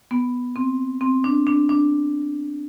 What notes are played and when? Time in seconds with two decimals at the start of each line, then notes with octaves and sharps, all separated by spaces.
0.11 B3
0.56 C4
1.01 C4
1.24 D4
1.47 D4
1.69 D4